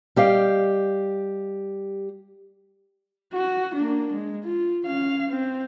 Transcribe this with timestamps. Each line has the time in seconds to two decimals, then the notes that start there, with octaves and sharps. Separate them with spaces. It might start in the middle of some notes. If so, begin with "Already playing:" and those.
0.16 G3 G4 D#5 F5
3.33 F#4
3.75 A#3 D4
4.13 G#3
4.44 F4
4.84 C#4 F5
5.30 C4